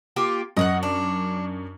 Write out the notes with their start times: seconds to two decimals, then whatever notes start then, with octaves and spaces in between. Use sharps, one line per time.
0.16 A#3 F4 G4
0.57 F#2 D#5 F5 F#5
0.83 D4